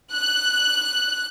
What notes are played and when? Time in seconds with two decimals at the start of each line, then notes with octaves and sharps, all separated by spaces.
0.13 F#6